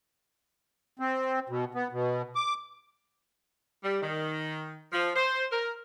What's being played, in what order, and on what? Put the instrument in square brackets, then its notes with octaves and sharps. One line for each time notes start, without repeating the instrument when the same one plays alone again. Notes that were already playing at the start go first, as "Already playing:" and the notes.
[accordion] C4
B2
B3
B2
D6
[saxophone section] G3
D#3
F3
C5
A#4